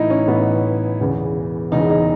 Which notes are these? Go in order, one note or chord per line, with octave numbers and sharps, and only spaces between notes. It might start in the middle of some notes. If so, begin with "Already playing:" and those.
Already playing: A1 A2 E3 D#4 E4
C#4
A1 A2 E3 B3
E1 E2 C#3 E3
E1 E2 C#3 E3 D#4
D#4